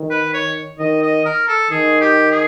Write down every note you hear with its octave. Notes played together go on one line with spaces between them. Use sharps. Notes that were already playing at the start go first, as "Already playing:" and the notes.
Already playing: D#3
B4
C#5
D#3 D#5
D#5
A#4
A4
D#3 G#4
G4
G#4